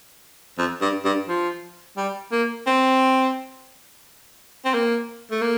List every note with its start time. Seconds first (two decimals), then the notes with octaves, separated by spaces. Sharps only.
0.58 F2
0.81 G2
1.05 G2
1.28 F3
1.97 G3
2.32 A#3
2.67 C4
4.65 C4
4.74 A#3
5.31 A3
5.42 A#3